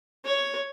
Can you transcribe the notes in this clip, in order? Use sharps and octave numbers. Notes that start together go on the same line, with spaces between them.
C#5